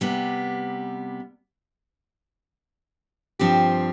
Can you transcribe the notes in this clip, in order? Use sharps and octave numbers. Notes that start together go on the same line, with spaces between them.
C3 G3 B3
G2 F3 C4 G4